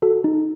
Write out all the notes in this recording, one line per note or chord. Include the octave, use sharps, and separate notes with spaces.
F#4 A4
D#4